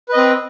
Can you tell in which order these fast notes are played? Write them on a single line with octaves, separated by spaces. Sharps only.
B4 D#5 C4